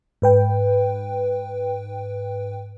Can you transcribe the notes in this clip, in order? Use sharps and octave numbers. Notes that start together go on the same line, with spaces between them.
G#2 B4 G5